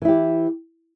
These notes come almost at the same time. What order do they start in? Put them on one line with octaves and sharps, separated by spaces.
E3 E4 G4